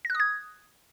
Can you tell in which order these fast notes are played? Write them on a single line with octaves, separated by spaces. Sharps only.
A#6 F#6 D#6 G#6